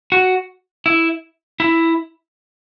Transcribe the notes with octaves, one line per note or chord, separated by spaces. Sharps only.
F#4
E4
E4